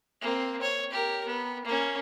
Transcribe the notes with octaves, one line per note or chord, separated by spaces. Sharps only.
A#3 C4
C#5
G4 A#4
B3
A#3 C#4